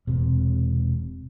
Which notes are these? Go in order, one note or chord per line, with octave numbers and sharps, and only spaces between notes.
E1 C3